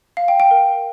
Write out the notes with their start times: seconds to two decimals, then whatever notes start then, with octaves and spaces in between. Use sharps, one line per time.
0.17 F5
0.28 G5
0.40 G5
0.51 A#4